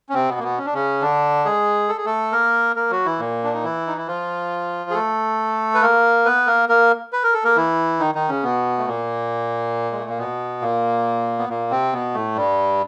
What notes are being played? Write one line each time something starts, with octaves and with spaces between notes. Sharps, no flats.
C#4
C3 C4
B2 B3
A#3
B2 B3
C#4
D4
C#3 C#4
D3 D4
G#3 G#4
A4
G#4
A3 A4
A#3 A#4
A#3 A#4
F#3 F#4
E3 E4
A#2 A#3
D4
D#4
E3 E4
D#4
E4
F3 F4
G#4
A3 A4
B4
A#3 A#4
B3 B4
A#3 A#4
A#3 A#4
B4
A#4
A4
A#3 A#4
E3 E4
D#3 D#4
D#3 D#4
C#3 C#4
B2 B3
A3
A#2 A#3
G#3
A3
A#3
B2 B3
A#2 A#3
B3
A#2 A#3
C3 C4
B2 B3
A2 A3
G2 G3